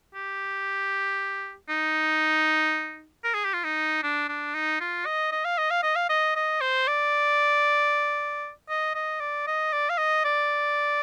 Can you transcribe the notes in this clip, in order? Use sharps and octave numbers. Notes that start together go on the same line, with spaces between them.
G4
D#4
A#4
G#4
G4
F4
D#4
D4
D4
D#4
F4
D#5
D#5
F5
D#5
F5
D#5
F5
D#5
D#5
C5
D5
D#5
D#5
D5
D#5
D5
F5
D#5
D5